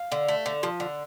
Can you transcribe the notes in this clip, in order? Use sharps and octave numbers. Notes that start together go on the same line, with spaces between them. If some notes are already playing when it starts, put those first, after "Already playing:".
Already playing: F5
D3
A3
D3
F3
D3